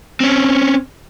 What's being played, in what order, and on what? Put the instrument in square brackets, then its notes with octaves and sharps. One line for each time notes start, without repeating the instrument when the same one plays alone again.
[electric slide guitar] C4 C#4